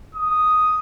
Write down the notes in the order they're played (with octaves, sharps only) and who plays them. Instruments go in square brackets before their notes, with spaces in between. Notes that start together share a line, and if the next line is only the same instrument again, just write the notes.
[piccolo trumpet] D#6